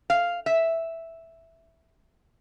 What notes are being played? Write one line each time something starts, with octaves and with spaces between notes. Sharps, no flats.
F5
E5